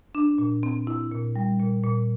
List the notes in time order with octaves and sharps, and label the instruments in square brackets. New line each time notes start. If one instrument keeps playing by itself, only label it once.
[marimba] D4
A#2
C4
E4
A#2
G3
A#2
A#2